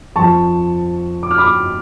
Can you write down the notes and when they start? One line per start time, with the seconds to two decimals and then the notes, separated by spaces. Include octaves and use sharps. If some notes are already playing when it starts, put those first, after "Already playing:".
0.16 F2 F3 A5 C#6
1.23 D6
1.31 F6
1.38 B5 D6